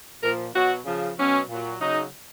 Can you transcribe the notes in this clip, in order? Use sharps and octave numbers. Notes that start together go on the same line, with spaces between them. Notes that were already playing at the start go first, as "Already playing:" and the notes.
A#2 F3 A#4
B2 F#3 F#4
C#3 F3
B2 F#3 C#4
A#2 F#3
C#3 F#3 D#4